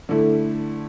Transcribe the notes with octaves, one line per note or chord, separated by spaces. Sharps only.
D3 A3 E4